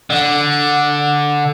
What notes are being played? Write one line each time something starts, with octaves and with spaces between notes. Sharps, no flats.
D3